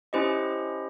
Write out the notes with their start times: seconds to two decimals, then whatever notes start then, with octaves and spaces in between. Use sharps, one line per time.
0.13 C#4 E4 G4 C5 D#5